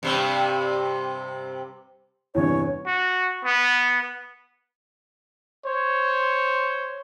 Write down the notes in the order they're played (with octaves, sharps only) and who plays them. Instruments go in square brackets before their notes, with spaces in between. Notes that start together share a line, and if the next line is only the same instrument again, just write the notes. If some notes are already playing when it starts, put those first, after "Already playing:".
[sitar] G2 C3 G3
[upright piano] E2 G2 C3 [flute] C#5
[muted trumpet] F#4
B3
[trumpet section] C5 C#5